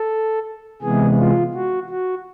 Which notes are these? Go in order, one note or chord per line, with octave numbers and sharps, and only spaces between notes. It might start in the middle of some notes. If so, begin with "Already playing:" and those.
Already playing: A4
C3 E3 G#3 B3 G#4
F4
F#4
F#4